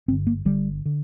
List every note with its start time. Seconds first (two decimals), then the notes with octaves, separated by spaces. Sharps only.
0.08 G1 G2 D3 C4
0.27 A#3
0.45 G1 G2 D3 G3
0.86 D3